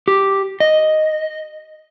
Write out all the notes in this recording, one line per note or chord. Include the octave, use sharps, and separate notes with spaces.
G4
D#5